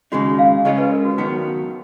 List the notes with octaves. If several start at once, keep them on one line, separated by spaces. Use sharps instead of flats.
D#2 C#3 G#3 D#4 F#4
F5
C#3 G#3 C#4 F4 D#5
B4
A#4
F#4
D#2 D#3 F#3 B3 D#4